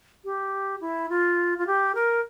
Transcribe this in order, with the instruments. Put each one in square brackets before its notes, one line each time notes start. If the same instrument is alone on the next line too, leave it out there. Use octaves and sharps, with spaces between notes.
[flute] G4
E4
F4
F4
G4
A#4